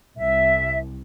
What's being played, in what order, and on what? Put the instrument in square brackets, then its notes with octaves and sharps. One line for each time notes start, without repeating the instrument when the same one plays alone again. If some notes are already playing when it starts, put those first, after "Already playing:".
[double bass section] C2 [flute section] E5